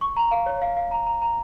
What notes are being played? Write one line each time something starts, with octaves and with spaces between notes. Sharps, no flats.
C#6
A#5
F5
C#5
F5
F5
A#5
A#5
A#5